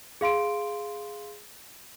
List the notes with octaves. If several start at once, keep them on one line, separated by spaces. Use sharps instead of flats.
G#4 F5 C6 D7